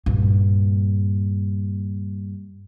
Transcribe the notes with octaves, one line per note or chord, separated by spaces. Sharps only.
G2 A#2